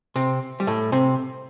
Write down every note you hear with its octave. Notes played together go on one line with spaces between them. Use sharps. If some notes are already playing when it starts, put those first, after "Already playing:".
C3 C4
G3
A2 A3
C3 C4